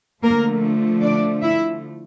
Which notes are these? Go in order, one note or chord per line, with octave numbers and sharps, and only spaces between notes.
D3 F3 A3 A#3 A#4
D4 D5
E4 E5